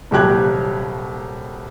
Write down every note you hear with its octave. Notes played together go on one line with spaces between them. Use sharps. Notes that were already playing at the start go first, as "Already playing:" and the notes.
D#1 C2 F#3 G4 F#6 G#6